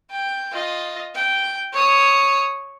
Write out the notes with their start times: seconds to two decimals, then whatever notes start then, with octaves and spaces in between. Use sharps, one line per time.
0.10 G5
0.53 F4 D#5
1.14 G5
1.72 C#5 D#6